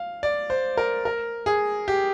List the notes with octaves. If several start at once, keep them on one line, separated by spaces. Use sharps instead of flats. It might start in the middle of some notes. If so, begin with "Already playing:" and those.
Already playing: F5
D5
C5
A#4
A#4
G#4
G4